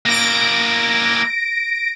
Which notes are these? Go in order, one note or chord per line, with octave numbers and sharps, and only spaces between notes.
A#3 E4 A#6 D7